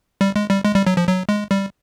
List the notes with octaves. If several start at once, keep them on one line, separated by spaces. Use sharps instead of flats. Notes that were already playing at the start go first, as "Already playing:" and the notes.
G3
G#3
G3
G#3
G3
F#3
F3
F#3
G#3
G3